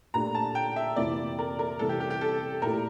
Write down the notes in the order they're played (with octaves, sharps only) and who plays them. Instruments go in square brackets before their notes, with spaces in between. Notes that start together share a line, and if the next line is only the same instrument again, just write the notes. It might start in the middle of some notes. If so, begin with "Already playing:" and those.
[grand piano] A#2 A3 D4 G4 [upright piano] A#5
[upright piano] A5
G5
E5
[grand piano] F2 C3 E3 A#3 E4 [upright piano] D5
[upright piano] A#4
A#4
[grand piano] C3 E3 G3 [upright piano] A4
[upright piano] G4
G4
G4
A4
[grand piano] A#2 A3 E4 G4 [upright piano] A#4